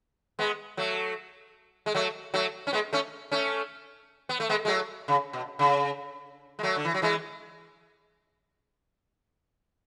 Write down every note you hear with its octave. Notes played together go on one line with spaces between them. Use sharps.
G#3 B3
F#3 A3
G#3
F#3 A3
F#3 A3
C#4
G#3 B3
A3 C#4
A3 C#4
B3
A3
G#3 B3
G#3
F#3 A3
C#3
B2
C#3
G#3
F#3 A3
D3
E3
F#3
E3 G#3